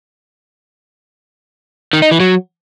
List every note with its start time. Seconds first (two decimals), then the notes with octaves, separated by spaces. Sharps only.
1.93 D#3
2.02 D#4
2.11 E3
2.20 F#3